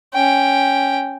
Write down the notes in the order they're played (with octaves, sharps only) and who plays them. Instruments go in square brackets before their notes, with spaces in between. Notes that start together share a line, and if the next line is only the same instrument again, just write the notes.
[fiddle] C#4 G5